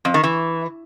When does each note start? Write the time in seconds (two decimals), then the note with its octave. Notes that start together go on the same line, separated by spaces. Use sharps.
0.05 F2
0.14 D#3
0.24 E3